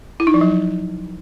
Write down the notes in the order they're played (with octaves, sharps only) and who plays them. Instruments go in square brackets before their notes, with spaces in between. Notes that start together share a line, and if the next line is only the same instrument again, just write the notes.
[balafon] E4
D#4
F3
F#3